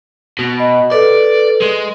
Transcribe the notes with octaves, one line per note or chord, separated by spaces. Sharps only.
B2
D#5 B5
A4 B4 D5
G#3